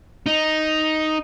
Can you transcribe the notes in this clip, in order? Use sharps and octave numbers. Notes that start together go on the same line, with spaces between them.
D#4